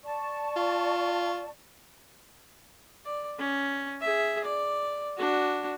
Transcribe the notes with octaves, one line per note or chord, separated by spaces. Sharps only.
D5 A5 C#6
F4
D5
C#4
G#4 E5
D5
D4 F#4